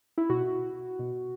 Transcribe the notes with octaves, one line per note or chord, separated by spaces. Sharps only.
E4
B2 F#4
B2